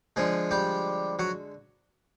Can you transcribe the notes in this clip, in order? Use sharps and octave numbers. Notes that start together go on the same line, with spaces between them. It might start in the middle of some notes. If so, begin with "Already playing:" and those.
D3 F3 G#3 G#4
G3 G4
F#3 F#4